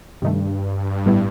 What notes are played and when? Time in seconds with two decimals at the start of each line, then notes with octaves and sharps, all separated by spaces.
0.22 G2 C3 D#3 A3
1.06 A2 G3 B3 E4